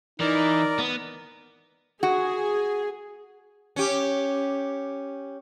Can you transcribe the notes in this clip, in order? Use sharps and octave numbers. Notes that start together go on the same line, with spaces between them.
E3 D#4 A#4 D5
B3
F#4 G#4
C#4 G4